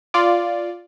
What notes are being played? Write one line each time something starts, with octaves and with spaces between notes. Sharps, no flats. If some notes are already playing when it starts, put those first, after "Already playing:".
F4 D5